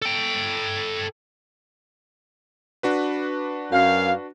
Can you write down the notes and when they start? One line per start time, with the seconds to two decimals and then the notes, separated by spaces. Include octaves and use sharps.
0.02 A4 G5
2.83 D4 F#4 B4
3.72 F#2 F5